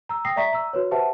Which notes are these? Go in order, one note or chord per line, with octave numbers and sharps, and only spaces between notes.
A#5 E6
G5 D#6 A#6 C7
D5 E5 A#5 C#6 B6
A#5 E6
F#4 B4 C#5
G4 B4 C5 E5 F#5 A5